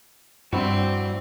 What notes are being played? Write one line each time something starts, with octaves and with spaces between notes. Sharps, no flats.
G2 G3 C4 E4 F#4